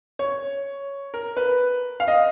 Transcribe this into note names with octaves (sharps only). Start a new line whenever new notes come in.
C#5
A#4
B4
F5
D#5